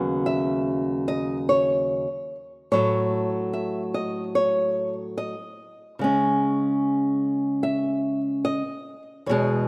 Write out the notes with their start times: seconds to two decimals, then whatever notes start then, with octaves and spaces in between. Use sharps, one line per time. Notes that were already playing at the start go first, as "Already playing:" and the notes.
Already playing: D#2 C#3 F#3 B3
0.26 E5
1.08 D#5
1.49 C#5
2.72 A2 F#3 A3 C#5
3.53 E5
3.94 D#5
4.35 C#5
5.18 D#5
5.99 C#3 G#3 C#4
7.63 E5
8.45 D#5
9.26 E2 B2 G#3 C#5